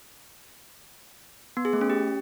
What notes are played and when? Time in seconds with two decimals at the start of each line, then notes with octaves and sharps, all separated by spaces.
1.57 B3
1.65 G#4
1.73 A3
1.81 C#4
1.90 G4